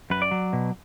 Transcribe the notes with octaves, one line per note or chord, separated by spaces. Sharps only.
F#2 B4
D5
F#3
B2